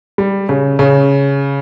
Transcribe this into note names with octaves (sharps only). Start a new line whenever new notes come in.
G3
C#3
C#3